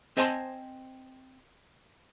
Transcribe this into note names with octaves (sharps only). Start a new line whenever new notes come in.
C4 C5 D#5 G#5 A5 C6